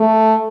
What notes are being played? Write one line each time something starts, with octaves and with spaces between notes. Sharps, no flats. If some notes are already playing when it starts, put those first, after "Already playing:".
Already playing: A3